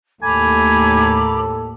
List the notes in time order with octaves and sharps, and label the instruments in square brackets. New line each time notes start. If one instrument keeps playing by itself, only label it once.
[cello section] D#2 A2 [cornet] A4 [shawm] G#5 [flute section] A#5 B5 D6